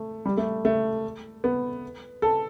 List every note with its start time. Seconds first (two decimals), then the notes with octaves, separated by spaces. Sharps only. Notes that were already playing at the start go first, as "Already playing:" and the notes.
Already playing: A3
0.25 G3
0.37 A3
0.65 A3
1.44 B3
2.22 A4